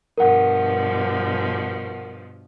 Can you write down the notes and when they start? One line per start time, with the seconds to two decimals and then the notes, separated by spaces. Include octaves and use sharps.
0.18 G2 B2 F3 A#4 F#5